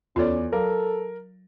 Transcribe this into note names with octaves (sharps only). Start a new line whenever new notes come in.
E2 C#4 F4 A4 C#5 D5
F#3 A4 A#4 F5